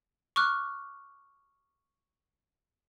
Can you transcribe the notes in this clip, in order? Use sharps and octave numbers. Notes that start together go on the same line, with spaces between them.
C#6 D6 F6 F#6